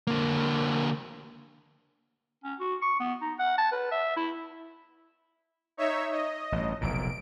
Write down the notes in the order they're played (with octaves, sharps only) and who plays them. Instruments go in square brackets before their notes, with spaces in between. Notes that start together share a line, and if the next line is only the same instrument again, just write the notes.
[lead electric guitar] D3 A#3
[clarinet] C#4
F#4
C#6
B3
D#4
F#5
A5
B4
E5
E4
[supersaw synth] D#4 C#5 E5
D#5
[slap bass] A1 G2
[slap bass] F1 B1 A#2 [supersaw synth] D7